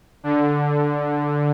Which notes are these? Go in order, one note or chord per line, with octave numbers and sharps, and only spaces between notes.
D3